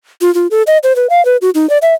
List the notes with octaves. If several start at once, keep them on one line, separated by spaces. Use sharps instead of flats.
F4
F4
A4
D#5
C5
B4
F5
B4
F#4
D#4
D5
E5